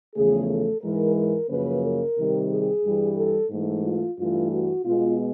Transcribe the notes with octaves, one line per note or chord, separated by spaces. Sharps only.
E2 C#3 F3 A3 G#4
A4
G#2 E3 G#3 A#4
A#4
F#2 C#3 F3 A#3 B4
A#4
C3 D#3 G3
G#4
G2 E3 G3
A4
G#2 E3 A3
F4
G2 E3 A3 F4
F#4
B2 G#3 B3 F4